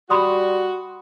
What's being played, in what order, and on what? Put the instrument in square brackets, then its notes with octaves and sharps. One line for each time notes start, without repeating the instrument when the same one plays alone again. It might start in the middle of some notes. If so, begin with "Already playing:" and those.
[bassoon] G3 [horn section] F#4 [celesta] B5 C6 D#6